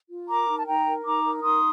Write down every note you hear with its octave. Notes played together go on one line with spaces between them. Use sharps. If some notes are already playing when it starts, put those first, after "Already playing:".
F4
A#4 A#5 D6
D#4
A5
D#4 G5 A#5
A#4
D#4 A#5 D6
A#4
D#4 C6 D#6